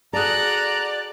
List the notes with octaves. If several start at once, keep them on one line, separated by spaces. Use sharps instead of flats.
F#4 G#4 A4 D5 A#5 F#6